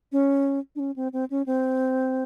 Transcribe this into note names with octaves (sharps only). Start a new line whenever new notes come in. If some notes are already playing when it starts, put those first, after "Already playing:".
C#4
D4
C#4
C4
C4
C#4
C4